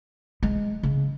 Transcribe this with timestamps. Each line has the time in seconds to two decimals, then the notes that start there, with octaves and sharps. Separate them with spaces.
0.43 G#3
0.83 C#3